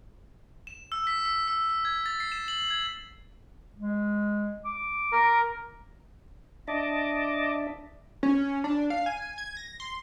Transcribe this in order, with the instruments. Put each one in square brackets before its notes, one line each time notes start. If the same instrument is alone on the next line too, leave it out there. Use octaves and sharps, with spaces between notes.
[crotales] E7
E6
B6
E6
E6
E6
G#6
A6
C7
E7
F#7
G#6
[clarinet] G#3
D6
[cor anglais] A#4
[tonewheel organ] D4 E5 [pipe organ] D#5 A5 D6
[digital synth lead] C#4
D4
F5
G#5
G#6
A#6
C6